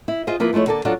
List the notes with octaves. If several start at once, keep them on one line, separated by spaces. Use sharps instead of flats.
E4
F4 G#4 C5 D#5
F3 A#3 E4 F4 B4
F3 G#3 A3 E4 C#5
D3 A#3 A4 D5 A5
F#3 D4 F4 A4 F#5